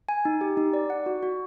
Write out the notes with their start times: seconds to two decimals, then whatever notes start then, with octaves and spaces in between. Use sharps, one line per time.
0.09 G#5
0.25 D#4
0.41 G4
0.57 D#4
0.73 D5
0.90 F#5
1.06 F#4
1.23 F#4